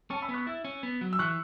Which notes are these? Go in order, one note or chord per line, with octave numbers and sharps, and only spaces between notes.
C#4 A5 C#6
B5 E6
B3
C#6 F#6
E4 E6 A6
C#4
B3
F#3
E6
E3 C#6 F#6